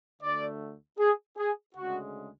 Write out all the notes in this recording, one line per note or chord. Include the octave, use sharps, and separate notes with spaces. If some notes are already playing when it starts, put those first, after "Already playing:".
D2 D3 A3 D5
G#4
G#4
D2 C#3 G#3 F#4